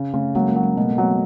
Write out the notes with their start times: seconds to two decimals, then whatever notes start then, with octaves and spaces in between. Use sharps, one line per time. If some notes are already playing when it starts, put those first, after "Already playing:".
Already playing: C#3
0.14 C#3 A3
0.35 F#3 G#3 A#3
0.49 G#3 A#3
0.56 F#3
0.63 G#3
0.77 B2 A3
0.90 C4
0.98 F#3 A3 B3